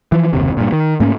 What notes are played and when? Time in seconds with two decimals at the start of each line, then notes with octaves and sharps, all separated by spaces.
0.12 E3 F3
0.33 F#1 D#2 C3
0.57 G2 A#2
0.72 D#3
1.00 G#2 A3 A#3 C#4